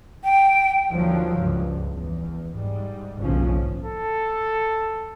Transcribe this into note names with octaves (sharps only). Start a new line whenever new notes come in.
G5
D#2 D3 F3 F#3
C#2 G2
E2
G#2 G3
F#1 B1 G#2 D3 F3 C#4
A4